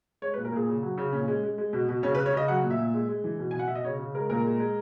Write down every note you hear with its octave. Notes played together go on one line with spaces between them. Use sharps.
G#3 C#5
B4
A#2
A#4
A#2 G#4
C#3
F#3
C#3
A#2 C#4
G#3
G#3
G#3
B2
B2
C#3 C#4
B4
C#3
C#5
C#3 D#5
F#3 F#5
A#2
E5
A#2
G#3
G#3
E3
B2
B2 G#5
F#5
B2 E5
D#5
C#3 C#5
C#3
G#3 A#4
A#2 A#4
G#3
G#3